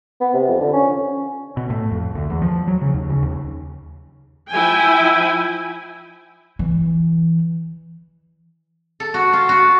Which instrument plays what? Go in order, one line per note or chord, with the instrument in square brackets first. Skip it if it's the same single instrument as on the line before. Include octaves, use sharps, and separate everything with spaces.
[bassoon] B3
C3
F2
D3
C#4
[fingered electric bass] B2
A2
F2
D2
E2
F3
F#3
C#3
D#2
C#3
D#2
[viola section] F3 E4 G5 G#5
[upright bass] E3
[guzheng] A4
F#4
F4
F#4